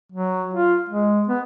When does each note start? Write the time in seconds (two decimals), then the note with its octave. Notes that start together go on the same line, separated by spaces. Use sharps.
0.12 F#3
0.54 F4
0.89 G#3
1.27 B3